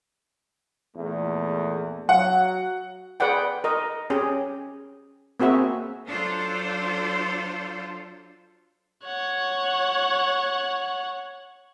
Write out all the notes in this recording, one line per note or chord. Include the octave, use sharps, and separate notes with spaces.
A#1 E2 A3
F#3 F#5
G#4 B4 D5 F#5 G5
A#4 D#5
C#4 G4 G#4
A#3 C4 F#4 G#4 E5
F#3 D4 F4 A4 C5
C#5 F#5